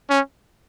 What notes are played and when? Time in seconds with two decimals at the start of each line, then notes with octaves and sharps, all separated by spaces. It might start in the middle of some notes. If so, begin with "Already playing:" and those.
0.10 C#4